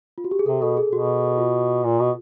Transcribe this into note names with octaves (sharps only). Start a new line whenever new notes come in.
F4
F#4
G4
G#4
C3 A4
B2 A4
G#4
B2 F#4
F4
A#2
B2